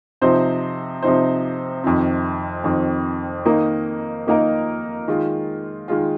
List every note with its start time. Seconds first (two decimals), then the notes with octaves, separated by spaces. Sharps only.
0.21 C3 F3 C4 D#4 C5
1.03 C3 F3 C4 D#4 C5
1.84 F2 D#3 C4
2.64 F2 D#3 C4
3.45 D#3 A#3 D#4 A#4 D#5
4.27 D#3 A#3 D#4 A#4 D#5
5.08 D#3 G#3 F4
5.88 D#3 G#3 F4